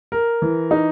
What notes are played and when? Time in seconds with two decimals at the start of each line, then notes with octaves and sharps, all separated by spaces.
0.12 A#4
0.42 E3
0.71 D#4